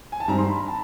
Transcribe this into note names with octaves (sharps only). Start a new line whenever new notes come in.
G#5
A5
G2 D#3 G3 C4 A#5
C6
B5
A#5
A5